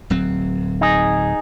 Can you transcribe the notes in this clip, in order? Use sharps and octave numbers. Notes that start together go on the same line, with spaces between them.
D1 F#3 C4
D#4 G#4